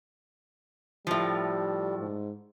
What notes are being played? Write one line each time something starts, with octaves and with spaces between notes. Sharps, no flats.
A2 F3 G3
G#2